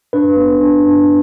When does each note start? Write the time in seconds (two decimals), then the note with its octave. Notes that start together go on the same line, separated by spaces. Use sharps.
0.13 D4 B4
0.37 B3
0.61 D4
0.85 D4